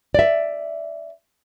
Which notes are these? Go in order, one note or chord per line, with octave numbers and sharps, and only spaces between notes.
D5 E5